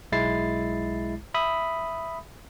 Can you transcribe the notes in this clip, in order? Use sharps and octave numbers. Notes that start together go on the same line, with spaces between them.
B1 G#3 E4 A6 C7
E5 B5 D#6